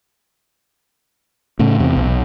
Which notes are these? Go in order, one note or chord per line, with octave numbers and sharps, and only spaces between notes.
A2 C#3
E2 C3
B1